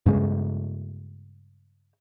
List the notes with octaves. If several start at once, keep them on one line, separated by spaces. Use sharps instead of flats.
G2 C#3 G#3